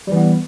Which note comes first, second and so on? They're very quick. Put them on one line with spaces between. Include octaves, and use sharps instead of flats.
G3 E3 B3